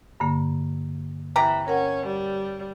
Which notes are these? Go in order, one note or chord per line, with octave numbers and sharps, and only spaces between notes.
G2 D3 A#3
C3 E3 G4 A#5
C#4 A#4 F#5
G3